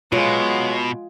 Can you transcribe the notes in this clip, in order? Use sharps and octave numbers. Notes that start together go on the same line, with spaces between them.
B2 F#3 G#3 F4